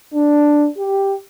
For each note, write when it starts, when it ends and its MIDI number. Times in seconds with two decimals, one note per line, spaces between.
0.13 0.67 62
0.77 1.16 67